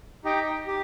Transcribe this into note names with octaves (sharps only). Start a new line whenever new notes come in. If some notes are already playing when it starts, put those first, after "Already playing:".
D#4 G4 D#5 G5
G4